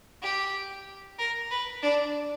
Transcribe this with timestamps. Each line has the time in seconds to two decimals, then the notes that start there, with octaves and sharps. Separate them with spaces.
0.22 G4
1.19 A#4
1.51 B4
1.82 D4